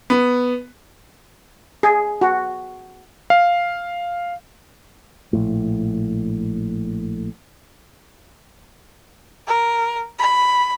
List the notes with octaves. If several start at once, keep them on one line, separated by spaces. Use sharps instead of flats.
B3
G#4
F#4
F5
A#1 A2
A#4
B5